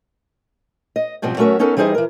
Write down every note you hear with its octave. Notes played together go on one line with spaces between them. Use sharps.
D#5
G#2 B2 F3 G3 C4
F#3 A3 C#4 F#4 A#4 E5
B3 C#4 D#4 A4 A#4
E3 G3 D#4 G#4 C5 D#5
E3 A#4